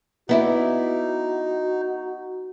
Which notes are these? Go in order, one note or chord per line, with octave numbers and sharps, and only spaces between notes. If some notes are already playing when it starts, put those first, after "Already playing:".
B3 D#4 E4 F#4 D5